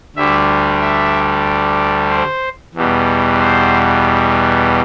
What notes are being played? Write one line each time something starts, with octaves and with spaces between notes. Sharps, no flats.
D2 D3 G3 E5
E5
C5
E2 B2 G3
C5